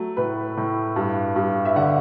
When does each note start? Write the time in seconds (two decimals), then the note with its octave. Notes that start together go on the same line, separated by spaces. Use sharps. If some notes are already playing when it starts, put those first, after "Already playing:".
Already playing: F#3 A3
0.17 A2 B4
0.57 A2
0.96 G2
1.36 G2
1.65 E5
1.76 D3 D5 F#5